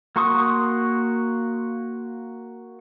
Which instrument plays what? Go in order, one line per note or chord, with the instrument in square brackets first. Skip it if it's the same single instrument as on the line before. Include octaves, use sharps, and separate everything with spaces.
[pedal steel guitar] A#3 F#4 C6 C#6 D#6